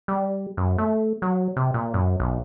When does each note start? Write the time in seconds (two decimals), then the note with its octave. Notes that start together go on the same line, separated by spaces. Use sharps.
0.08 G3
0.57 F#2
0.78 A3
1.22 F#3
1.57 C3
1.74 A#2
1.94 F#2
2.20 B1